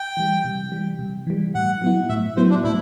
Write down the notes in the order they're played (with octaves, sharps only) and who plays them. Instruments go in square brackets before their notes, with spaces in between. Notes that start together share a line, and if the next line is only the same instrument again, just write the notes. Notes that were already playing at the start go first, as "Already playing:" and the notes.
Already playing: [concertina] G5
[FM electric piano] E3 G3
C3
E3 G3
C3
E3 G3
[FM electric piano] A2 [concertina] F#5
[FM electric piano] F#3 B3 E4
[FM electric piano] A2 [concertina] E5
[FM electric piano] F#3 B3 E4 [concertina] C5
[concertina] D4
[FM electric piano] A2 [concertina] E4